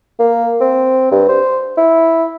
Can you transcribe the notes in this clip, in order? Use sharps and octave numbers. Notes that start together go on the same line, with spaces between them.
A#3
C4
G2
C5
E4